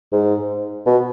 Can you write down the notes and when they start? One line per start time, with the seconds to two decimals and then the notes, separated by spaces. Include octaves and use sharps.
0.12 G#2
0.86 B2